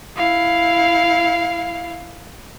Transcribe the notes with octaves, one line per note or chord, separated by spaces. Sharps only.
E4 F5